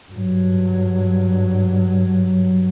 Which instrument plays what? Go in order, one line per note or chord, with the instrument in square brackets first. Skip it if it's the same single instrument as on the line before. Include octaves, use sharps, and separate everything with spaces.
[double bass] G2 F#3